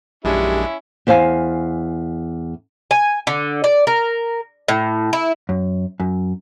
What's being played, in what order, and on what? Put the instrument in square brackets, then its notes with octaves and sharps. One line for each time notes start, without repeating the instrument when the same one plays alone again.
[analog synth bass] A#1 [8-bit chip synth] F#2 G#3 D4 [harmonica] C#4 E4 [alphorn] G4
[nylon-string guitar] E2 C5 F5 F#5 G#5
[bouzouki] G#5
D3
D5
A#4
A2
E4
[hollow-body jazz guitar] F#2
F#2